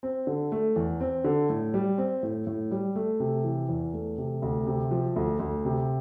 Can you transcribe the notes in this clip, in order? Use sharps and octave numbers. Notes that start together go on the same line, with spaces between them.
C4
D3
A3
E2
C4
D3
A2
G3
C4
A2
A2
G3
A3
C3
E3
E2
A3
C3
D2
C3
F3
D2
D2
C3